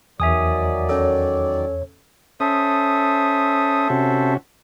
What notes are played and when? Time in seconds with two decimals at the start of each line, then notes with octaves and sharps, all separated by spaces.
0.20 E2 D#3 F#3 D5 E5 G#5 D#6
0.89 C#4 A4 C#5
2.40 C#4 A4 C5 E5 D#6
3.90 C3 C#4 F#4